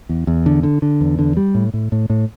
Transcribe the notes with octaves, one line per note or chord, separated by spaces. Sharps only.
E2
E2
D3
D3
D3
E2
D3
G3
A2
A2
A2
A2